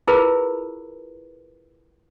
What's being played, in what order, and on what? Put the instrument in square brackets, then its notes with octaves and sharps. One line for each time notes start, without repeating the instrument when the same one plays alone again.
[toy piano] E4 F4 G#4 A#4 B4